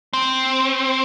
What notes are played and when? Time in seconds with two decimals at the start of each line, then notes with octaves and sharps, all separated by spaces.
0.13 C4